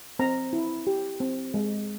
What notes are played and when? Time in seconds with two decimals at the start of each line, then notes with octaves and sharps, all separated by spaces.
0.19 C4 A#5
0.53 E4
0.87 G4
1.20 C4
1.54 G#3